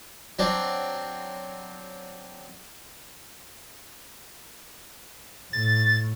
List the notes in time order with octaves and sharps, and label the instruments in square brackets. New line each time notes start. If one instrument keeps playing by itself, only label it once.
[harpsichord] F#3 C4 D4
[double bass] A2 [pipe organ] A6